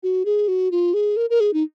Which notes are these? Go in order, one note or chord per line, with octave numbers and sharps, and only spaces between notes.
F#4
G#4
F#4
F4
G#4
A#4
A#4
G#4
D#4